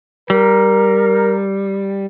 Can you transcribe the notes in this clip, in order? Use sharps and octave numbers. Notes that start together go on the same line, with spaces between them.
G3 A#4